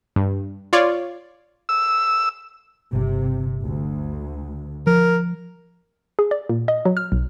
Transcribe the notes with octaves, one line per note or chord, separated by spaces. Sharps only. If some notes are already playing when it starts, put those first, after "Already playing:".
G2
F4 C#5 D5
E6
G1 C3
D2
F3 A#4
G#4
D5
A#2
D#5
F#3
F6
B1